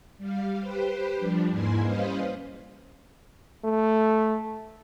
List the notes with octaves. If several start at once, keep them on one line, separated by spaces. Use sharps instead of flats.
G3 F5
G4 B4 C5
F3 G3 D4
E2 G#2 A#3 E4 G#5 C6
G3 C#4 B4 C5 D#5 F5
A3